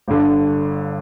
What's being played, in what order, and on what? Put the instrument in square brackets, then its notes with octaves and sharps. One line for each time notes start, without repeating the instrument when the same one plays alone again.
[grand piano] G1 G2 D3